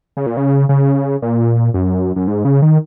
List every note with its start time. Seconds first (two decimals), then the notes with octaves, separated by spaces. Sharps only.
0.17 C#3
0.26 A#2
0.37 C#3
0.69 C#3
1.22 A#2
1.74 F#2
2.16 F#2
2.27 G#2
2.45 C#3
2.62 D#3